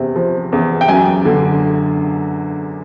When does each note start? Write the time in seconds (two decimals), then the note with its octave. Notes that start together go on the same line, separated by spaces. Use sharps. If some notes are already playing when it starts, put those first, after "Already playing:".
Already playing: E2 C3
0.16 F3
0.52 E2
0.81 G5
0.88 F#2 G#5
1.25 D3